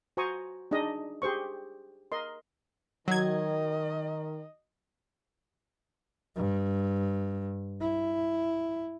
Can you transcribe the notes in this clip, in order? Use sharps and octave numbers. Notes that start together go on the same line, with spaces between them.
F#4 C5 G#5 A#5 C#6 D#6
D4 D#4 G#4 D#5
G4 G#4 C5 C#6
A#4 D#5 C6
D#3 F#3 D#5 G#6
G2
E4